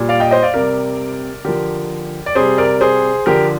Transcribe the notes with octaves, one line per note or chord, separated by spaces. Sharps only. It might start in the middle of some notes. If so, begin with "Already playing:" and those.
Already playing: A#2 G3
D5 F5
D#5 G5
C5 D#5
D5 F5
C3 G3 A#4 D5
D3 F3 G4 A#4
D5
C3 G3 G#4 C5
A#4 D5
G#4 C5
D3 F3 G4 A#4